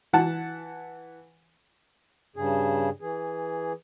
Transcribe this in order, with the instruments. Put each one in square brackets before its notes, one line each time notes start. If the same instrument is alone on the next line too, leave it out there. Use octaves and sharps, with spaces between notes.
[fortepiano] E3 F#5 A5
[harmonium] G2 C#3 G#4
E3 G#4